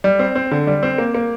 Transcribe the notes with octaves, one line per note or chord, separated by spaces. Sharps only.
G3
C4
C4
D3
G3
C4
A#3
A#3